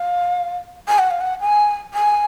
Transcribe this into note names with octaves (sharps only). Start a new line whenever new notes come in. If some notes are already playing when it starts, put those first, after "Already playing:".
Already playing: F5
G#5
F#5
F5
F#5
G#5
G#5